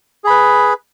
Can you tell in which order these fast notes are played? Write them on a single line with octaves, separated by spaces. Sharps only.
G#4 B5 B4